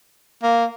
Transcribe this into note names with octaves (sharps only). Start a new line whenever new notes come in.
A#3